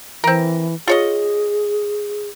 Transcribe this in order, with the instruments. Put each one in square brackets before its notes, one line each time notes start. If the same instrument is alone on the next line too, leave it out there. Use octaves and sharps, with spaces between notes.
[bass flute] E3 [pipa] C4 A#4
[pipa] F4 C#5 D#5 [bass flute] G#4